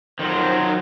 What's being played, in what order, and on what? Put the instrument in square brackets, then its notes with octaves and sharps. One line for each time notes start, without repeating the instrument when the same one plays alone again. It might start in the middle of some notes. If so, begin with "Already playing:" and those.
[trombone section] F2 C5 [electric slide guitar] D#3 F#3